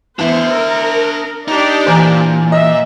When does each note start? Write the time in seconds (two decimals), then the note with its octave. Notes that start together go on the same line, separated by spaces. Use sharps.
0.19 E2 B3 D4 C5 E5
0.51 A#4 E6
1.48 D4 D#4 G4 D5
1.87 A#2 E3 C5 G#5 A#5
2.52 D#5 E5